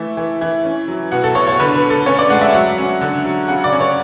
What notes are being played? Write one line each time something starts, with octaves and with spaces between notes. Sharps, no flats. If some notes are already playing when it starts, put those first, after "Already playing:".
Already playing: E3 A3 E5
E3
E3
C#4
F#3
B2 F#5
A4
B2 C#5
C#5
D3 B4
B4
D3
A4
C#4 C#5
D5
G#3 F#5
E5
F#3 F#5
C#4
D3
F#3
C#3 F#5
D5
C#4
C#5